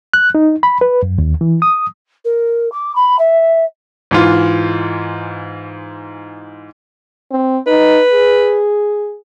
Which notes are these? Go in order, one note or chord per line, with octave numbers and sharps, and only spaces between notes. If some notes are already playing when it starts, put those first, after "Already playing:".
F#6
D#4
B5
B4
F#2
D#2
E3
D#6
A#4
D6
B5
E5
G#2 E3 F4
C4
D#4 B4
G#4